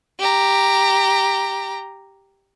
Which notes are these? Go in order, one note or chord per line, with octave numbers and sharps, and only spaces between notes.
G4 A#5